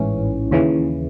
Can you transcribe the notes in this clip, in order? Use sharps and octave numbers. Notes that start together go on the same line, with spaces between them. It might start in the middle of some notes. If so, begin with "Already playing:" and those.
Already playing: A1 G#2 E3 C#4
D#2 C#3 E3